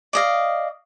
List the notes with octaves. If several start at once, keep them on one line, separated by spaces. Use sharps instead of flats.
D5 D#5 F5